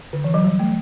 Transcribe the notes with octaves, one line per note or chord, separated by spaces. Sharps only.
D3
E3
F#3
G3
A3